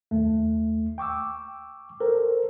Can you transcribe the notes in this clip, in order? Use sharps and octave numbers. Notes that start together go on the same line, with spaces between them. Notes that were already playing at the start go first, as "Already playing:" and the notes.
D#2 A3
G5 C#6 D6 E6
A4 A#4 C5